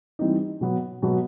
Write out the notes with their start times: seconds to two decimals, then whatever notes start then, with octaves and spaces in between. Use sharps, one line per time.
0.19 E3 G3 C4 D#4
0.61 B2 F#3 B3
1.02 B2 F#3 B3